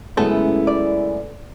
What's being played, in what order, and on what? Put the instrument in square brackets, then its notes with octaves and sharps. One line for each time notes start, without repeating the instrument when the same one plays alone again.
[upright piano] F#2 C#3 G#3 [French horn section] A2 E4 [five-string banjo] A3 B3 A4
[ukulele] D5